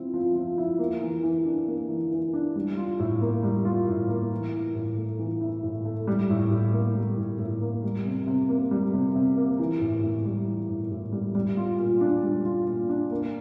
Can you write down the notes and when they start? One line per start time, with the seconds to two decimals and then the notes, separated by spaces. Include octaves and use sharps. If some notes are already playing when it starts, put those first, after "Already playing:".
Already playing: F3 C4 E4
0.14 F3
0.35 F3
0.58 E4
0.79 A#3
1.02 E3
1.23 E3
1.45 D4
1.67 A#3
1.89 E3
2.11 E3
2.33 D4
2.56 G3
2.77 F4
2.99 A2
3.21 A#3
3.43 G3
3.65 F4
3.87 A2
4.09 A#3
4.31 E3
4.53 E4
4.75 A2
4.97 A3
5.19 E3
5.41 E4
5.63 A2
5.85 A3
6.07 G3
6.30 A2
6.51 A2
6.73 A#3
6.95 G3
7.17 A2
7.39 A2
7.61 A#3
7.83 G3
8.05 C3
8.27 C3
8.49 A#3
8.71 G3
8.93 C3
9.15 C3
9.37 A#3
9.59 E3
9.81 A2
10.03 A2
10.25 G3
10.47 E3
10.69 A2
10.91 A2
11.12 G3
11.35 G3
11.57 F4
11.79 A#2
12.01 D4
12.23 G3
12.45 F4
12.67 A#2
12.89 D4
13.11 A#3